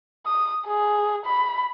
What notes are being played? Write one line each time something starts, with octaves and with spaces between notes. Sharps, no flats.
D#6
G#4
B5